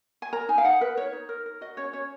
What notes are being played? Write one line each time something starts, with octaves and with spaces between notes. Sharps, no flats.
G#5
A#4 A#5
D#4 G#5
F5
D#4 F#5
A#4 B4
A#4 C#5
D#4
A#4
A#4
F#4 D#5
C#4 C#5
C#4 C#5